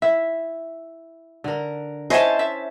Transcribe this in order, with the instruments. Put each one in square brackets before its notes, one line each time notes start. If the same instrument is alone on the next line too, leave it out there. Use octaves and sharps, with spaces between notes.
[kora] E4 [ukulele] E5
[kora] D3 A#4
[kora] C#4 E4 C#5 [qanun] C5 A5 [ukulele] D#5 E5 G#5
[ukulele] E5